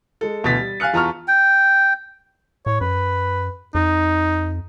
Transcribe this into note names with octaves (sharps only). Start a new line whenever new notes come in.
G#3 A4
D2 B2 E3 A6 B6
G3
F5 G#5 F6 F#6 C#7
E2 F4 A5 A#5 C#6 F6
G5
A2 C#5
F#2 B4
F2 D#4